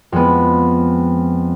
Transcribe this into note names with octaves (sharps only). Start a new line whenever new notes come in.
F2 G#3 B3